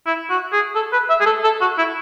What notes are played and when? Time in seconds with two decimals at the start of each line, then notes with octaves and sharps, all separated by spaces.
0.07 E4
0.30 F#4
0.52 G#4
0.75 A4
0.93 B4
1.10 E5
1.21 G#4
1.26 A4
1.44 A4
1.61 F#4
1.78 E4